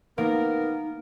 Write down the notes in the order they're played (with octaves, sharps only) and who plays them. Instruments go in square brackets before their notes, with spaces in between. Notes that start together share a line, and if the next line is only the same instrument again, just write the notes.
[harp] A#3 [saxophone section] B3 A#4 [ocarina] D#4